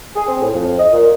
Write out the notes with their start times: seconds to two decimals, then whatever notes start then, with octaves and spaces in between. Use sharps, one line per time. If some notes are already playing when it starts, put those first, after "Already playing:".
0.16 G#4
0.28 C4
0.42 A2
0.55 F2
0.79 D#5
0.93 A#2